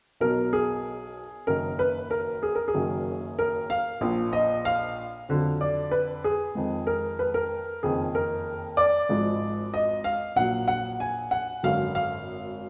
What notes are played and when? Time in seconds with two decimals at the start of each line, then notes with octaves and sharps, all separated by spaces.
0.20 B1 B2 F#3 A#4
0.53 G#4
1.47 F#1 F#2 D#3 A#4
1.79 B4
2.11 A#4
2.43 G#4
2.55 A#4
2.68 G#4
2.74 F#1 F#2 D#3 F#3
3.39 A#4
3.70 F5
4.01 A#1 A#2 F3
4.33 D#5
4.65 F5
5.29 F2 D3 F#3
5.61 D5
5.91 B4
6.24 G#4
6.55 F2 D#3 G#3
6.87 A#4
7.19 B4
7.34 A#4
7.83 F#1 F2 D#3 G#4
8.15 A#4
8.77 D5
9.09 G#1 G#2 F3 G#3
9.74 D#5
10.04 F5
10.36 A#1 A#2 F#3 F#5
10.68 F#5
11.00 G#5
11.31 F#5
11.63 G#1 F#2 D3 F#3 F5
11.95 F5